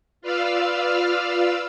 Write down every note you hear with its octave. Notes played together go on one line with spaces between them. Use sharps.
F4 B4 D5 F5 E6 F6